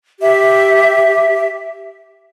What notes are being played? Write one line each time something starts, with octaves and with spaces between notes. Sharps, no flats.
G4 E5